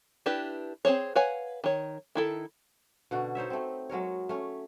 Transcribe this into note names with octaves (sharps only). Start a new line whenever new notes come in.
D4 E4 G4 B4
C4 G#4 C5 C#5
B4 C#5 F5 F#5 G#5
D#3 C#5
D#3 E4 A4
B2 D3 F#4
D#4 C5 C#5 E5
A3 C4
F#3 G#3 A#4 C#5
A3 C#4